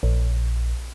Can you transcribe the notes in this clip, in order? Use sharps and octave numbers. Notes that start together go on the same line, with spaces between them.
A#1